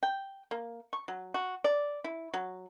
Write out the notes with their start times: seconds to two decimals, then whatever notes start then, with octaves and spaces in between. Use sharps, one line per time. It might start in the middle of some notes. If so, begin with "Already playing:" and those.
0.03 G5
0.51 A#3
0.93 C#6
1.08 F#3
1.34 F#4
1.64 D5
2.04 E4
2.34 F#3